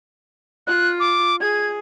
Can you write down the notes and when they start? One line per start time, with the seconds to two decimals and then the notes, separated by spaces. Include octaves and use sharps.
0.67 F4 F#6
1.00 D6
1.41 G#4 G#6